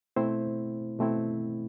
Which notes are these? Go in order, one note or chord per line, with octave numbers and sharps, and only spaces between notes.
B2 A3 C4 E4 C5
B2 A3 C4 E4